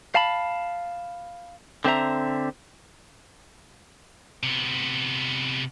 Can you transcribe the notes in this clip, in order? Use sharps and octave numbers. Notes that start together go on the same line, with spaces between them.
F5 A5 B5
D3 C4 C5 E5 A#5
C3 B3